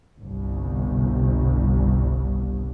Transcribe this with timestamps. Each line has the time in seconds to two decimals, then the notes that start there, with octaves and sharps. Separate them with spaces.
0.18 G1 C2